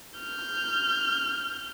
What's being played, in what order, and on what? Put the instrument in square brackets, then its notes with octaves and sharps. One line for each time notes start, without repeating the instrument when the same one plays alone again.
[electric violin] F6 G6